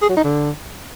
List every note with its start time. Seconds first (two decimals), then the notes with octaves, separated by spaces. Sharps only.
0.02 G#4
0.09 F#3
0.17 D#4
0.24 D3